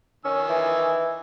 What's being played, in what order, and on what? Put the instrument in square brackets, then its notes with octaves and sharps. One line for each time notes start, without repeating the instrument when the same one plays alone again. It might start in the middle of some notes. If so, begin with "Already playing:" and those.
[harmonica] D#3 G#5 E6 [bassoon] C#4
[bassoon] E3